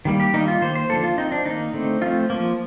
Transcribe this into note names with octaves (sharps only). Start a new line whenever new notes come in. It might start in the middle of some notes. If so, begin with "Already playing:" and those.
D#3 G3 A#3
G4
D#3 G3 A#3 D#4
F4
D#3 A#3 C5
C5
D3 F3 A#3 A4
F4
F3 C4 D#4
D4
D#3 A#3 D#4
D3 A3 C4
F3 A3 C4 F4
F3 A#3